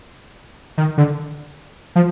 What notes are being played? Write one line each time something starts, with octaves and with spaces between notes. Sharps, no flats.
D#3
D3
F3